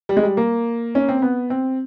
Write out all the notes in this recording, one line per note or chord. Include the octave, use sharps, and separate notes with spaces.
G3
G#3
G3
A#3
C#4
C4
B3
C4